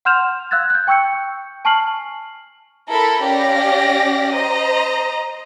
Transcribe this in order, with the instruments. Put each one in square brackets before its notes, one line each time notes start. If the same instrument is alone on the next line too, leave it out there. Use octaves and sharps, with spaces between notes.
[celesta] F#5 C6 F6 G6 E7 F7
F5 E6 F#6 G#6 A6
F#6 G6
G5 C#6 E6 G6 C#7
G#5 A5 C#6 F6 C7 F#7
[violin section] E4 A4 A#4 B5
C#4 G4 D5 F5 A#6
C5 D#5 A#5